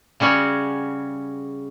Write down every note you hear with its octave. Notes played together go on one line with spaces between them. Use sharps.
C#3 G3 C#4 F#4 G#4